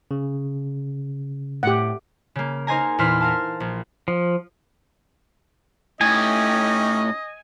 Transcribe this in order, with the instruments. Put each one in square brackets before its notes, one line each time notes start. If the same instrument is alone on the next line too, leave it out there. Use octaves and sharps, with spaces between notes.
[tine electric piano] C#3
[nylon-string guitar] A2 [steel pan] G4 F#5
[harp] C#3 A#3
D#4 A#4 C5 D#5 G#5 A#5
E2 A#2 E4 C5 F6 B6
A#4 F5 A5
A#1
[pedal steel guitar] F3
[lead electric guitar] A2 [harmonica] C#4 D#4 G4 [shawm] D#5 [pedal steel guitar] G#5